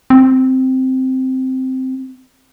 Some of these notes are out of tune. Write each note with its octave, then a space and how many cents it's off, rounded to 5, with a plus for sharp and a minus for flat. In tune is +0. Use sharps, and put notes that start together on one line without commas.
C4 -5